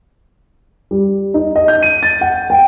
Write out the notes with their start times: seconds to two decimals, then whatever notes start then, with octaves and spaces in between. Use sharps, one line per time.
0.91 G3
1.34 D#4
1.56 D#5
1.68 G6
1.83 D#7
2.03 A6
2.21 F#5
2.50 G5